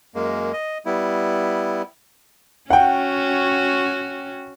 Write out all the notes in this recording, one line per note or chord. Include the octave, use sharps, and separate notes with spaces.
F#2 G#3 A#3
D#5
G3 B3 E4
C#4 F#4 F#5 G5